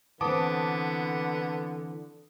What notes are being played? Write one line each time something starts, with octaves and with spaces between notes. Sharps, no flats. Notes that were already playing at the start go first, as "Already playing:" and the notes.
D3 E3 B3 C4 A5 D6 D#6